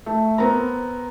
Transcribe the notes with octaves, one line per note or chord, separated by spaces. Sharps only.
A3
B3 C4 A#4 A#5